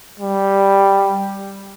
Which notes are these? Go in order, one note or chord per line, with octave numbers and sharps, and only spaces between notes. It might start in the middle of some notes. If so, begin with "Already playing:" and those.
G3